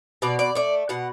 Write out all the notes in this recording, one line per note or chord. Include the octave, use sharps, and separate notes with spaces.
B2 D5
D5
A3 D5
B2 F#5